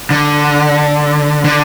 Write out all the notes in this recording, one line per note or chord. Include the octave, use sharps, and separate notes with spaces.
D3
D3